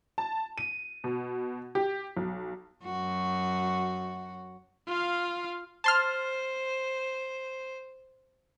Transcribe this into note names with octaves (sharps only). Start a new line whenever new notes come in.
A5
D#7
B2
G4
B1
F#2 F#4
F4 F5
C5 A5 C6 F6